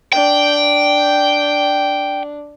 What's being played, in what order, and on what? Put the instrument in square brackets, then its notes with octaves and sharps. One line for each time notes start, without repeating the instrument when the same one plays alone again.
[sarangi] D4 [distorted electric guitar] G5